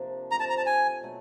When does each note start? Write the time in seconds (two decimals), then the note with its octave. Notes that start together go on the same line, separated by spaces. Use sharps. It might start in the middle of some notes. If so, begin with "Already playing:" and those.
Already playing: C3 F3 A#3 D4
0.31 F3 A3 C4 A#5
0.40 A5
0.50 A#5
0.57 A5
0.66 G#5
1.01 B2 F#3 A3